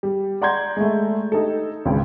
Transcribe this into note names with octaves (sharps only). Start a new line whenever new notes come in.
G3
D5 F#5 A#5 C6 G6 G#6
G#3 A3
D#4 G4 A4
G#1 C#2